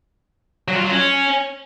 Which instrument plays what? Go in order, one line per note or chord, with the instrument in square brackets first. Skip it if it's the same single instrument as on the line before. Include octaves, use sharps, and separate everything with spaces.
[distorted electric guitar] F#3
F4
F#3
C#4